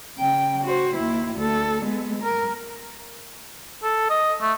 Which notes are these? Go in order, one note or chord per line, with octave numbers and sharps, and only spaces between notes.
C#3 G5
F#4 C5
D#2 E4
D2 A4
G#3 B3
A#4
A4
D#5
A3